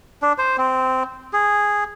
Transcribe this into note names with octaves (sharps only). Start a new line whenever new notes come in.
D4
C5
C4
G#4